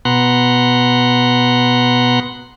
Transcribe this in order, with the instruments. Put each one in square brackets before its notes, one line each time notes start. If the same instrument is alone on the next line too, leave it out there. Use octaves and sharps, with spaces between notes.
[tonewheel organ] B2 B3 F#5 A#5 C6 F#6